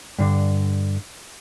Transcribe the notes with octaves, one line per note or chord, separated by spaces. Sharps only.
G2 D3